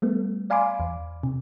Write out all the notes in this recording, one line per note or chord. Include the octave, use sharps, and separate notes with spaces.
G3 A3 B3
D5 F5 G#5 B5 C6 D6
E2
C3